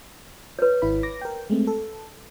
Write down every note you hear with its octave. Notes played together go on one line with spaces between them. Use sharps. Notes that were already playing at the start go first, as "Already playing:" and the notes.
B4 C#5
G#1 E4 B5
D6 A#6
A#4 G5
G#3 A3 C4
A4